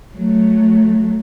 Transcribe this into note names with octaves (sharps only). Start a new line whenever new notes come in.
F#3 A3